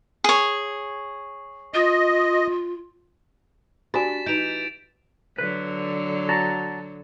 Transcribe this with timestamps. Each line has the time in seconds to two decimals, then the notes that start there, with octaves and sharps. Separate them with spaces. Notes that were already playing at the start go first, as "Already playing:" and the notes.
0.24 G#4 C#5
1.74 F4 D#5
3.94 D4 F#4 G4 G#5 A6 B6 E7
4.26 E3 D#4 G6 D7 F7
5.38 D3 F#3 B4
6.29 F#4 A5 A#5